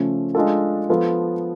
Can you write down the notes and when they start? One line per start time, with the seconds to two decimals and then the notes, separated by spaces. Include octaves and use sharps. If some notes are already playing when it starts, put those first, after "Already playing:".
Already playing: C#3 F3 A3 C#4
0.35 G#3 D4 F4 A4
0.89 F3 B3 F4 A4